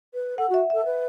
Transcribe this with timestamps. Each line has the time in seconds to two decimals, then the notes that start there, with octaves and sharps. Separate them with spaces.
0.14 B4
0.38 A4 F#5
0.49 F#4 E5
0.70 A4 E5
0.85 B4